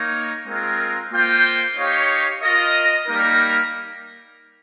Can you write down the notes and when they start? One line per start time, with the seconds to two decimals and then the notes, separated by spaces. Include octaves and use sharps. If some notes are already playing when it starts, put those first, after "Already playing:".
Already playing: A#3 D#4 A#4 C#5 G5
0.46 G#3 C4 F4 A#4
1.11 A#3 F4 C5 G5
1.76 D#4 G4 C#5 F5
2.42 F4 A#4 D#5
3.07 G3 A#3 D#4 A#4